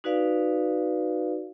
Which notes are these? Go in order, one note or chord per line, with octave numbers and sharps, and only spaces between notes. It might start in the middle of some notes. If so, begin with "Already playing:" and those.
D#4 F#4 B4 D5 F5